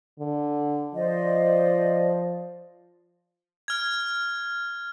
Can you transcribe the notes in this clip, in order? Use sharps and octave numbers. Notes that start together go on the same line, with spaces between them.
D3
F3 C5 D5 D#5
F6 G#6